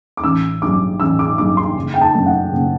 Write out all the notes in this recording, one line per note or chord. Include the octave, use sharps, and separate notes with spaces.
D6
A1 E6
G2 F#3 D6
A1 E6
D6
G2 F#3 D6
C6
F#1
G5
A5
F#2 D3 A3
F#5
F#1